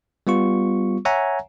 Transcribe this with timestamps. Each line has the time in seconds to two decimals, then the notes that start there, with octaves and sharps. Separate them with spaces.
0.27 G3 B3 F4 C#6
1.05 C#5 E5 F#5 G#5 A#5